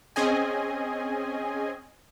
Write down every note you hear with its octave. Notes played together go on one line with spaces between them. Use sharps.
C4 C#4 G#4 D#5 G#5